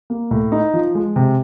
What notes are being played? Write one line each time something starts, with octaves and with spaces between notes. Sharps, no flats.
A#3
A2
D#4
F3
G#3
C3